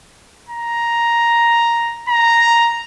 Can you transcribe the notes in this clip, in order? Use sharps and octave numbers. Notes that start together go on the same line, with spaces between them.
A#5
A#5